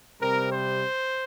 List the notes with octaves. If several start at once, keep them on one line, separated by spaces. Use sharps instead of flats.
C3 G3 C4 A#4
C5